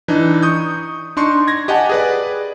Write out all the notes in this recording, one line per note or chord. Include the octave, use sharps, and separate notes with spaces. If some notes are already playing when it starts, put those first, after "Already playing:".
E3 D4 D#4
C#6 D#6 G6
D4 D#4 C6 C#6
G#6 A#6
G4 D#5 F#5 G#5 A5
G#4 B4 D5